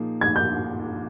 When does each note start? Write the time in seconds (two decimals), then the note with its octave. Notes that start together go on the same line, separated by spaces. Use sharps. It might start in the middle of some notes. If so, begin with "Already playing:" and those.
Already playing: A#2 F3 A#3 D#4 G#4
0.21 G#6
0.36 G6